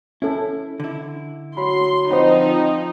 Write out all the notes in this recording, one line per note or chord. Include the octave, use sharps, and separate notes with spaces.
C#4 E4 A4
D3 E4
F#3 B5 C6
F3 C4 D#4 C5 F#5 B5